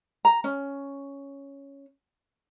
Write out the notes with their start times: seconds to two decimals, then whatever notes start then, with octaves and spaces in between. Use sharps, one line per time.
0.25 A#5
0.44 C#4